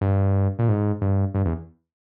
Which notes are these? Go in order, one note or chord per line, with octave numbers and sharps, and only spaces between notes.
G2
A#2
G#2
G2
G2
E2